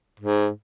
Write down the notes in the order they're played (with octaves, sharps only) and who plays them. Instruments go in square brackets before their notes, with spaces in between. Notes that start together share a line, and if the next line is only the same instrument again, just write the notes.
[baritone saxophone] G#2